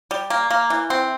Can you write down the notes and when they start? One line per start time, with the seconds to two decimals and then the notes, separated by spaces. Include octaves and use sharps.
0.11 G3
0.30 A#3
0.50 A#3
0.70 E3
0.90 C4